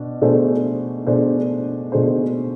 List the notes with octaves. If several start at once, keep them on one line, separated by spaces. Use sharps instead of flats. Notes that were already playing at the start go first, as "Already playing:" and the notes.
Already playing: B2 D4
B2 A3 D4 G#4 C5
B2 A3 D4 G#4 C5
B2 A3 D4 G#4 C5